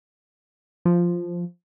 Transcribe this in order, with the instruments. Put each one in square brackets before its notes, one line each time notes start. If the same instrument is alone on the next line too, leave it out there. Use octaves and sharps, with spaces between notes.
[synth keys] F3